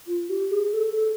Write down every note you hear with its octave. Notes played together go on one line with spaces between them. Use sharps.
F4
G4
G#4
A4
A4